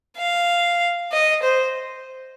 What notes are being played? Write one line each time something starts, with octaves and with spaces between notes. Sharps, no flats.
F5
D#5
C5